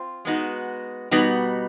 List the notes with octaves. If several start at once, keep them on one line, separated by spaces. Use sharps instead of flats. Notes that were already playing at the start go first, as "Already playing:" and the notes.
Already playing: C4 F4
G#3 B3 D#4 F#4
B2 G3 B3 D#4 F#4